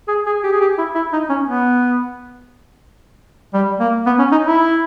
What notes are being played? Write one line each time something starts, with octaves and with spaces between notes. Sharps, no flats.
G#4
G#4
G4
G#4
G4
E4
E4
D#4
C#4
B3
G3
A#3
B3
C#4
D#4
E4